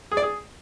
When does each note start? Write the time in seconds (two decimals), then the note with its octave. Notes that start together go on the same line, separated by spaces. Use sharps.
0.11 G#4
0.17 D5
0.22 G#4